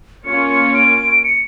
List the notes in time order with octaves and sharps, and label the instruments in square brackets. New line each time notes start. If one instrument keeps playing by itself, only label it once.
[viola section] A#3 C#4 F4 C#5 [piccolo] C#7
[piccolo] C#7
D7
C#7